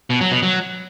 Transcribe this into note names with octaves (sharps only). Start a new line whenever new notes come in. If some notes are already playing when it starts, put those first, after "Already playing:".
B2
F#3
B2
F#3